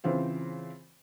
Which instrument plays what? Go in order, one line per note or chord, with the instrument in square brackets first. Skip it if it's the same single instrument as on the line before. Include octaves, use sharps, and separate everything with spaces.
[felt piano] C#3 E3 C4 F4 C5